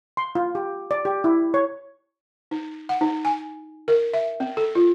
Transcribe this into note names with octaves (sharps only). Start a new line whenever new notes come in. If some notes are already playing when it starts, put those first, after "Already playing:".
C6
F4
G4
D5
G4
E4
C#5
D#4
F#5
D#4
G#5
A#4
E5
C4
A4
F4